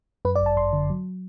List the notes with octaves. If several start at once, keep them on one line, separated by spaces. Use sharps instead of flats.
F#2 B4
D5
G1
A5
G1 C6
D3
F#3